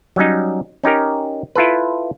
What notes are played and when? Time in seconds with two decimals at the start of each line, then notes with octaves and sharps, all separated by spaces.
0.16 F#3 G3 C#4 D#4
0.84 C#4 D#4 G4 A#4
1.55 E4 F4 A4 B4